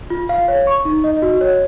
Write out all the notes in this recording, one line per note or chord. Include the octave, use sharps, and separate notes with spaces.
F4
F5
C#5
C#6
D#4
D#5
F#4
C#5